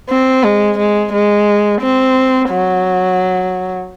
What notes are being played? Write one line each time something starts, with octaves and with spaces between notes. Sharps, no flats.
C4
G#3
G#3
G#3
C4
F#3